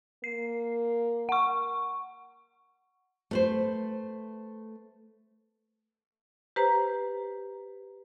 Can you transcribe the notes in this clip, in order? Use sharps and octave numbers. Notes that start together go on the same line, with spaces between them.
A#3 C7
F#5 C#6
A3 B4 C5
G4 B4 C5 A#5